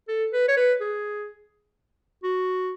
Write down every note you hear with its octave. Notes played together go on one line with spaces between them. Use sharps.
A4
B4
C#5
B4
G#4
F#4